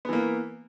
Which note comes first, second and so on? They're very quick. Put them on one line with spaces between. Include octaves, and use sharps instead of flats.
B3 E3 A#3